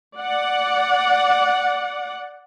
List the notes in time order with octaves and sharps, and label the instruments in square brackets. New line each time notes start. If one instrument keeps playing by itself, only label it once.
[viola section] D5 F#5